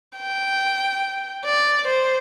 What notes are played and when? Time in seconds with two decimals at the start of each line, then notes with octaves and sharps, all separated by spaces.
0.17 G5
1.45 D5
1.87 C5